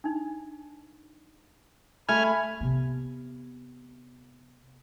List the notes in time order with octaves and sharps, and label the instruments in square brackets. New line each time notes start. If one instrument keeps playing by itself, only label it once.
[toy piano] D4 D#4
[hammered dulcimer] A3 [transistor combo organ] G#5 F6 [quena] B5
[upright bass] C3 B3